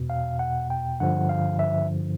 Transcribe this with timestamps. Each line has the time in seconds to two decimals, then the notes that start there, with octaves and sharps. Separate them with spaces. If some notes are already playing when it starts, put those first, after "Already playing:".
Already playing: E2 B2
0.10 F5
0.39 F#5
0.70 G5
1.00 G2 D3 F3 F#5
1.29 F5
1.59 E5